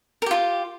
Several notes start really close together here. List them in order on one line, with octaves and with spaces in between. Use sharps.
A#4 G4 F4